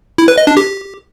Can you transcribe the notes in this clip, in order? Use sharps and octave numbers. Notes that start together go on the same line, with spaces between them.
E4
B4
D#5
D4
G4